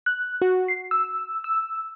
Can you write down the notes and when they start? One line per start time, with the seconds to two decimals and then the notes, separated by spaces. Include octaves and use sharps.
0.06 F#6
0.42 F#4
0.68 C7
0.91 E6
1.44 E6